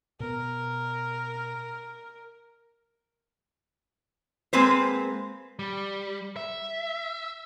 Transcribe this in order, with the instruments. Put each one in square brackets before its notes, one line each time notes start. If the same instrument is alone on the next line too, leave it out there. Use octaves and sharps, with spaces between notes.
[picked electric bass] B2 B3 [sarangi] A#4
[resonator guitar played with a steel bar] G#3 A#3 C4 B4 C5
[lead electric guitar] G3
E5